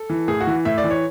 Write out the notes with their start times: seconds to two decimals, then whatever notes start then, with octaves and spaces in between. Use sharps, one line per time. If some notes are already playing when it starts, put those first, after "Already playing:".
Already playing: A4
0.10 E3
0.28 A2 G#4
0.41 F#4
0.47 E3
0.65 A2 E5
0.78 D5
0.84 E3
0.90 C#5